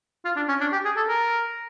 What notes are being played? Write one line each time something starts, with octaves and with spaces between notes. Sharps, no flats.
F4
D4
C#4
D4
G4
G#4
A4
A#4